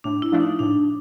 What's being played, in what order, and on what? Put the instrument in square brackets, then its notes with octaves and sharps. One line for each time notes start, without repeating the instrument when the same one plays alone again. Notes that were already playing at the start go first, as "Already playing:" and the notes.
[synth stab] A2 [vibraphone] D4
[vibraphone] E4
[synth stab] F3 A3 D4
[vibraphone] D#4
[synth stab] A2 [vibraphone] D4